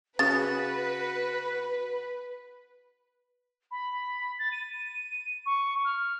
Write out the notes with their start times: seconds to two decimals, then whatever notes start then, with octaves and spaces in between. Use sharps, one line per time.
0.19 C#3 F#4 B4 A6
3.71 B5
4.39 A6
4.52 D#7
5.46 C#6
5.85 F6